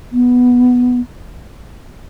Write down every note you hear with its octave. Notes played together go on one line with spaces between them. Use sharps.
B3